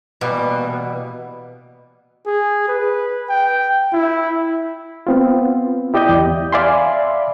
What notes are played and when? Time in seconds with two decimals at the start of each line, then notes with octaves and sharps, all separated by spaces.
0.21 B2 E3 G3 A#3
2.26 G#4
2.68 B4
3.29 G5
3.93 E4
5.07 B3 C4 F4
5.94 E4 G4 D5 D#5 G6
6.09 E2
6.53 D5 E5 F5 G#5 B5 C6